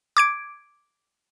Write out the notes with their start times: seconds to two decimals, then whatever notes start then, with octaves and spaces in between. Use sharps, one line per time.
0.17 D6 G#6 D7